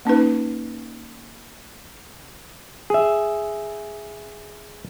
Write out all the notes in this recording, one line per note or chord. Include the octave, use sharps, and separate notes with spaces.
A#3 C#4 D#4 B4
G#4 E5